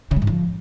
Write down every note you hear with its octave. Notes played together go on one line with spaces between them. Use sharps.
C#3
G#3
G#2
F3